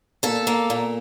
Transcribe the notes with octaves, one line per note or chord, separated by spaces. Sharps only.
A#2 A4
A#3
A#2